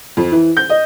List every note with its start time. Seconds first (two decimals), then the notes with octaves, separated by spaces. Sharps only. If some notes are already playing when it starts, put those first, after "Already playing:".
0.17 F2
0.32 E3
0.57 G6
0.70 D#5